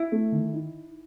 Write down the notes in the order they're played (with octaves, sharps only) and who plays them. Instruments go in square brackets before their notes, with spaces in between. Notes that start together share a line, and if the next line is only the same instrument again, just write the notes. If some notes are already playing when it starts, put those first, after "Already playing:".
Already playing: [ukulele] E4
[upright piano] A3
D#3
D#4